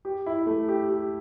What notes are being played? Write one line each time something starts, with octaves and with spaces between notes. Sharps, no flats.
G4
E4
A3
G4
G4